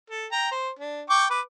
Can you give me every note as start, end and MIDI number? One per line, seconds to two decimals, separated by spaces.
0.10 0.27 69
0.32 0.49 79
0.32 0.49 82
0.51 0.70 72
0.79 1.02 62
1.10 1.26 79
1.10 1.26 85
1.10 1.26 86
1.30 1.41 71
1.30 1.41 86